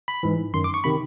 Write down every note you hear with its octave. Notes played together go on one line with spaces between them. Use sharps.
B5
G#2 E3
F#2 D#3 C6
D6
C#6
C3 D#3 B5